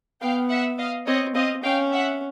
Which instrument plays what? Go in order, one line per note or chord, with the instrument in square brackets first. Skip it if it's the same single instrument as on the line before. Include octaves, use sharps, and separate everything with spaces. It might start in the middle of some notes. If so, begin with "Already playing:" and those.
[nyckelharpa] B3 [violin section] F5 G5
[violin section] E5 F#5
D#5 F5
[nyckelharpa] C4 [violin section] C#5 D#5
[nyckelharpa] C4 [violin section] D#5 F5
[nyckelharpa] C#4 [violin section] F5 G5
[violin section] E5 F#5